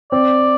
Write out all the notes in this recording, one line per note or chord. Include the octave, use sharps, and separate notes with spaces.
C4 D5